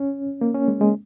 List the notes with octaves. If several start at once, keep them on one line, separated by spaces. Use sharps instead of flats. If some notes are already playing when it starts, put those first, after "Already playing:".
Already playing: C#4
A#3
C#4
G#3
G#3